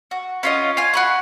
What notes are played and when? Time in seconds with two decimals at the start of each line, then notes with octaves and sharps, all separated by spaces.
0.11 F#4
0.43 C#4 F4 D#5
0.77 F4 G#5
0.93 F#4 B5 C#6